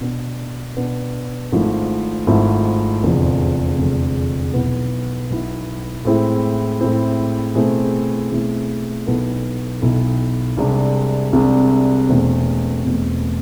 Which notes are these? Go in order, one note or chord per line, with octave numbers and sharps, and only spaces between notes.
B2 B3 D4
B2 B3 D4
G#1 G#2 F3 A3 E4
G#1 G#2 F3 A3 E4
F1 E2 D3 F3 G#3
F1 E2 D3 F3 G#3
B1 B2 B3 E4
B1 B2 B3 E4
A2 G#3 C4 E4
A2 G#3 C4 E4
B2 A3 C4 E4 G#4
B2 A3 C4 E4 G#4
B1 B2 B3 E4 A4
B1 B2 B3 E4 A4
C2 C3 G#3 D4
C2 C3 G#3 D4
E1 E2 B2 A3 C4
E1 E2 B2 A3 C4